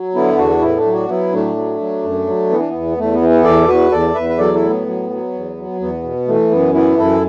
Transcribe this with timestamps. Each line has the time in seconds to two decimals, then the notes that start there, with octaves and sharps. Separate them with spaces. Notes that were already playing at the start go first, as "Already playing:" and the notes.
Already playing: F#3
0.15 D3 B3 E4
0.38 E2 D4 F#4
0.61 A2 B3 E4
0.77 A3 D4
0.85 F#3
0.93 D4 F#4
1.08 F#3 B3 E4
1.33 A2 A3 D4
1.56 F#3
1.80 F#3
2.03 F#2
2.27 F#3
2.50 E3 B3
2.59 D4
2.69 E2 B3
2.98 E2 A3
3.13 B3
3.21 E3
3.29 B3
3.44 E2 A4 D5
3.68 E2 F#4 B4
3.91 E2 A4 D5
4.15 E2 B4 E5
4.29 B4
4.38 F#3 A4 D5
4.54 E4 A4
4.62 A2
4.70 B3
4.87 F#3
5.10 F#3
5.33 E2
5.57 F#3
5.80 E2 B3
6.03 B2
6.28 E3 A3
6.51 F#2 B3
6.74 E3 B3 E4
6.98 F#2 E4 A4